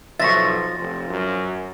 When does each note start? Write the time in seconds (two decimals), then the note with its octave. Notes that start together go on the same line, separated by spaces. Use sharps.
0.20 B1 F3 E5 C#6 A6 A#6
0.79 F1
1.10 F#2